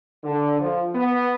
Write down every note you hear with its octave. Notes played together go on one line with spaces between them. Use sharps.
D3
F3
B3